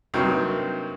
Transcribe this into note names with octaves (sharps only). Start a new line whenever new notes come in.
G2 C3 F#3 A#3 C4 D#4